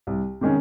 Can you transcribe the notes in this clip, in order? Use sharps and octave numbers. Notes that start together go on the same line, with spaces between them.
C2
C3 D#3 G#3 C#4